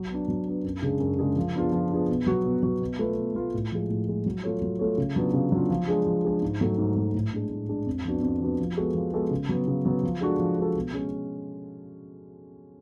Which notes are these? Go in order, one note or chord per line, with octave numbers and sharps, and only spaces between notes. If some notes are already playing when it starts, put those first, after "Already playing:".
Already playing: F#3
B3 D4
F#3
B3 D4
F#2
C#3 G#3 D4 G#4
F#2
C#3 G#3 D4 G#4
F3
B3 D4 F4 G#4
F3
B3 D4 F4 G#4
B2
F#3 B3 F#4
B2
F#3 B3 F#4
B2
A3 F4 B4
B2
A3 F4 B4
A2
F3 G#3
A2
F3 G#3
F#3
A3 F4 A4 C#5
F#3
A3 F4 A4 C#5
C#3
F#3 B3 D4 F4
C#3
F#3 B3 D4 F4
F3
G#3 D4 G#4
F3
G#3 D4 G#4
G#2
F#3 A3
G#2
F#3 A3
A2
G#3 D4
A2
G#3 D4
F2
F3 B3 D4 F#4
F2
F3 B3 D4 F#4
F3
G#3 B3 F#4 A4
F3
G#3 B3 F#4 A4
C#3
F#3 B3
C#3
F#3 B3
F3
G#3 D4 F#4 A4
F3
G#3 D4 F#4 A4
B2
G#3 C#4